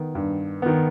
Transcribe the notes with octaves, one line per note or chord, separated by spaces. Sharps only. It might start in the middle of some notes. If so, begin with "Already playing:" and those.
Already playing: D#3 B3
G2
D#3 B3